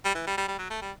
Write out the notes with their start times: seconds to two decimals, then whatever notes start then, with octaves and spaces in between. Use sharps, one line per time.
0.05 G3
0.15 E3
0.27 G3
0.38 G3
0.48 G3
0.59 F#3
0.70 A3
0.82 G3